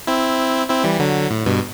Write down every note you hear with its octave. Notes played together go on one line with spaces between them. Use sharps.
C4 E4
C4 E4
E3 G3
D3 F#3
A2
G2 B2